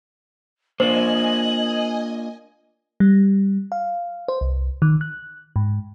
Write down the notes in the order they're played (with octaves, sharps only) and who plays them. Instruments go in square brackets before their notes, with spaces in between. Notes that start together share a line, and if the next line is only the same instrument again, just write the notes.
[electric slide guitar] A#3 D4 F4 [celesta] C5 [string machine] D#5 G#5 [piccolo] F#7
[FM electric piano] G3
F5
C5
C2
D#3
F#6
G#2